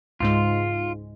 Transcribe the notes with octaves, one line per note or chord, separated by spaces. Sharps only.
C#2 G#2 G#3 F4